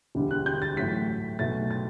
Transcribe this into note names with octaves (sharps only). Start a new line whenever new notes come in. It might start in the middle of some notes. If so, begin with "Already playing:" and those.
E1 D2 D3 G3
F#6
G6
A6
A1 A2 F#3 A3 B6
B1 B2 F#3 A3 A6
A6